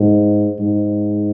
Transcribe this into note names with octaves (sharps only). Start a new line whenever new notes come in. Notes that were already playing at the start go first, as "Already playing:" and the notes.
Already playing: G#2
G#2